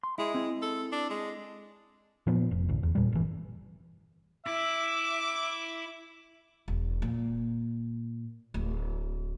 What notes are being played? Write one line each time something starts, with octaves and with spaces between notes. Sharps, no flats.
C6
G#3 E4
C4 E4
A4
D4
G#3
A#2 F3 B3
F1
A1 D2
E2
A#2 G3
G1 E3
E4 E5 D6
E1
A#2
D1